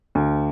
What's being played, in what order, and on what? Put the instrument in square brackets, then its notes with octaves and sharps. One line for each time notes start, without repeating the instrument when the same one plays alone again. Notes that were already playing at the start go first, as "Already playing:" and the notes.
[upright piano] D2